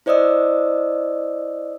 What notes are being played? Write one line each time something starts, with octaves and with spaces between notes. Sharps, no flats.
E4 C5 D5 D#5 D#6 E6